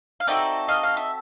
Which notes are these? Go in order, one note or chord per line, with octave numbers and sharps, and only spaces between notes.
F5
C4 D#4 F#4 A4 D5 E5
D#5 F5
F5
E5